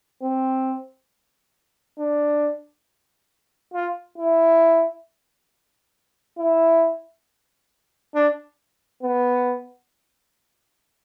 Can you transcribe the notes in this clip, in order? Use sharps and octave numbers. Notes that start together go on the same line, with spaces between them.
C4
D4
F4
E4
E4
D4
B3